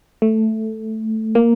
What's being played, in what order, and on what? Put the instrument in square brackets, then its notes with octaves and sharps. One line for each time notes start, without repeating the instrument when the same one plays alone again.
[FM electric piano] A3
A#3